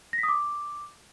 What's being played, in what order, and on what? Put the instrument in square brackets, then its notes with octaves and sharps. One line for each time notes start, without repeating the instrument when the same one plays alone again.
[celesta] A#6
B6
D#6
D6